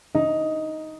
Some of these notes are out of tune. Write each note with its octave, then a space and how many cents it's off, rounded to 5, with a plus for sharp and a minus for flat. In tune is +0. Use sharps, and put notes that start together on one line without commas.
D#4 +10